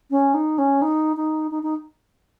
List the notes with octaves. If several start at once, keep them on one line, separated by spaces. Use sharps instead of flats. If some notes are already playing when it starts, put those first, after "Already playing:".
C#4
D#4
C#4
D#4
D#4
D#4
D#4